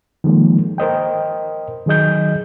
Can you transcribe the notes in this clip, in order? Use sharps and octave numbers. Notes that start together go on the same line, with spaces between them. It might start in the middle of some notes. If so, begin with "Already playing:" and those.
D#3 F3 G#3 A#3
A#4 C5 D#5 G5
D#3 F#3 G#4 D#5 G6